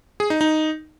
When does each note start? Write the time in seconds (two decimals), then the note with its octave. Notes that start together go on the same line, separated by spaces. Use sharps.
0.20 G#4
0.30 D#4
0.41 D#4